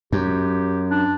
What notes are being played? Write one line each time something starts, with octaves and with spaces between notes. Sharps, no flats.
F#2 G4
D4